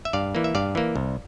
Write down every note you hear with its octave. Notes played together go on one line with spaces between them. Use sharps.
E5
G2 D5 F5
E3 A#3
E5
G2 D5 F5
E3 A#3
C2